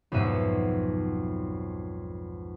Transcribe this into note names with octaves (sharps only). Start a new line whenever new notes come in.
B1 F2 G#2 F#4 E5 D#7